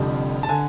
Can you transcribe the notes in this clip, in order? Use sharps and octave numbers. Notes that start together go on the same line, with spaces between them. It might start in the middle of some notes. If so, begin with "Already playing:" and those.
Already playing: F1 F2 D3 G3
A5
D3 G#5